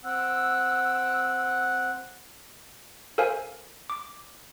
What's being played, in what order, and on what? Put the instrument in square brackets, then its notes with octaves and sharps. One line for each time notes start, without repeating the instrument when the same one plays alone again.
[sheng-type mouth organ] C4 F#5 [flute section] E6
[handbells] A4 A#4 C5 F5 G#5
D6